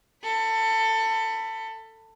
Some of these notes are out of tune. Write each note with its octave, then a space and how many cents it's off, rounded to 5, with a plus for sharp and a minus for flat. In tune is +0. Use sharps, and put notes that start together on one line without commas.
A4 +20 B5 +0